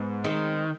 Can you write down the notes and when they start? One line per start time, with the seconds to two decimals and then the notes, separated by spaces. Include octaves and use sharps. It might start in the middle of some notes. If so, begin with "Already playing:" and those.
Already playing: G#2 B3
0.24 D#3 G#3 C4